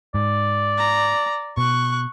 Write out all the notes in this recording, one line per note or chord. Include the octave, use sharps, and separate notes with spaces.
G#2 D5
A#5
B2 C#6 F#6